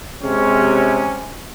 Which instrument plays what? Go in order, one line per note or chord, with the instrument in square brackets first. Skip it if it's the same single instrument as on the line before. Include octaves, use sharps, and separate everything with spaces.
[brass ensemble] C3 G#3 C#4